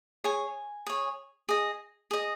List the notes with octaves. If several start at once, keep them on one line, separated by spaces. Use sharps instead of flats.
G#4 C#5 G#5
G#4 C#5
G#4 D#5
G#4 D#5